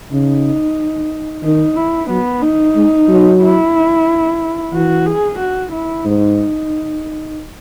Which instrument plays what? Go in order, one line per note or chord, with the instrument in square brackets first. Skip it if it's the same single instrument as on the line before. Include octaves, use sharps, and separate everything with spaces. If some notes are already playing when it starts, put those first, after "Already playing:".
[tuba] C#3 [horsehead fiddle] D#4
[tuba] D#3 [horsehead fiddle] D#4
[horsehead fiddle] E4
[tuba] F#3 [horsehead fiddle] B3
[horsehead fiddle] D#4
[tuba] G#3
F#3
[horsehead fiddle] E4
[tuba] E3 [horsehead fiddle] F#4
[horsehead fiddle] G#4
F#4
E4
[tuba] G#2 [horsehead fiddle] D#4